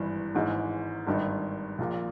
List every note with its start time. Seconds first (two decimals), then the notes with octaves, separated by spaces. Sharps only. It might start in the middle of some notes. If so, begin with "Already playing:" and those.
Already playing: G#1 G2 E3
0.35 G#1 G#2 E3
1.07 G#1 G2 D#3
1.78 A#1 A#2